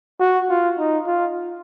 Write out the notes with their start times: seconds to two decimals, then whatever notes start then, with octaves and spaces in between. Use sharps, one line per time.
0.19 F#4
0.49 F4
0.78 D#4
1.07 F4